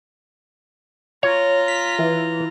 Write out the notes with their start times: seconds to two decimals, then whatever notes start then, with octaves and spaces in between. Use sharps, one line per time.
1.23 F4 C#5 A#5
1.68 B6
1.99 E3